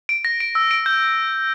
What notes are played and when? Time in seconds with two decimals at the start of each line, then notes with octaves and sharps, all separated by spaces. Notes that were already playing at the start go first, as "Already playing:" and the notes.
0.09 D7
0.25 A#6
0.40 D7
0.55 E6
0.71 D7
0.86 G6